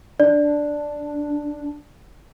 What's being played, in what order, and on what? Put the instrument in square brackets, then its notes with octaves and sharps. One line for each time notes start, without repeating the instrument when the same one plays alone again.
[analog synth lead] D4 [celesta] D5